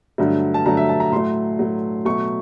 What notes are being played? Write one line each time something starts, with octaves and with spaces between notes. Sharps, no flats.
G2 D3 F#3 A3
A5
G2 D3 F#3 A3 A#5
E5
A5
A#5
A2 F#3 A3 C6
A2 F#3 A3
B2 F#3 A3 C#6